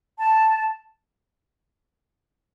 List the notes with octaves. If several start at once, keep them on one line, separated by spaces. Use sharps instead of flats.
A5